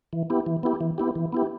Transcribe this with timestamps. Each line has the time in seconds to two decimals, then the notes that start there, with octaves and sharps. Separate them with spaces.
0.13 E3
0.30 B3 E4 G4
0.46 E3
0.63 B3 E4 G4
0.81 E3
0.98 B3 E4 G4
1.16 E3
1.32 B3 E4 G4